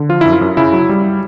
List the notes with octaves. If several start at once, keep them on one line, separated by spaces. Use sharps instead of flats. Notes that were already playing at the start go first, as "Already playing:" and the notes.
Already playing: D3
F3 F4
F#2 E4
F4
F#2
C#3 E4
F#3
G3